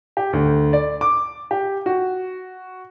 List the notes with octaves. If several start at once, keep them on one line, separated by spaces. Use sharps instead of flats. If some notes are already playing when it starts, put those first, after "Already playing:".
G4
D2
D5
D6
G4
F#4